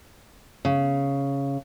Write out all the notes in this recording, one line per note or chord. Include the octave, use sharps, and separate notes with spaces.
C#3